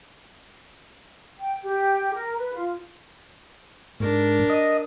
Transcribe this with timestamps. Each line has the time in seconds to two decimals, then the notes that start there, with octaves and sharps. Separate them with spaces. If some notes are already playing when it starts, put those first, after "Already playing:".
1.39 G5
1.64 G4
2.14 A#4
2.37 B4
2.55 F4
4.00 G#2 D4 A#4
4.50 D#5